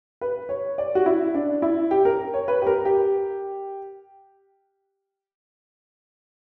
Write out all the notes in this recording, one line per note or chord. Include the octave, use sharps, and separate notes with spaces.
B4
C#5
D5
F#4
E4
D4
E4
G4
A#4
C#5
B4
G4
A#4
G4